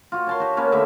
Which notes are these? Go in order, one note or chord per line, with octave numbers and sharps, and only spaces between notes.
F4 F#4
C#5 A5 C6
F#4 G4
A#3 C#4 B4 C#5
D3 A3 E5